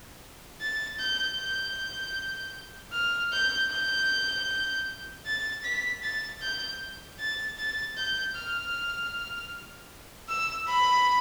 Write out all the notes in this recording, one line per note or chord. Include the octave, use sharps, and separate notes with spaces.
A6
G6
G6
F6
G6
G6
A6
B6
A6
G6
A6
A6
G6
F6
E6
B5